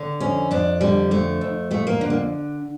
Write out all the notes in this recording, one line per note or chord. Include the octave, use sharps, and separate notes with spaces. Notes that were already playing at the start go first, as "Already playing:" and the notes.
Already playing: D3
F2 C#4
F2 D4
D3 G3
F2 A3
F2
F2 A3
A#3
D3
A#3